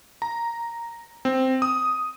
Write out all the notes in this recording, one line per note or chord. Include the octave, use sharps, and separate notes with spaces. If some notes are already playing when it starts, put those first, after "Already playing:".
A#5
C4
D#6